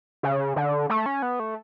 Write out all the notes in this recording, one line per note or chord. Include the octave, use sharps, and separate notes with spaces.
C#3
D3
A3
C#4
B3
A3